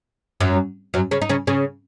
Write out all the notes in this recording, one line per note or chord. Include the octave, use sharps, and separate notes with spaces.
F#2 F#3
F#2 F#3
C#3 C#4
D#4
C#3 C#4
C#3 C#4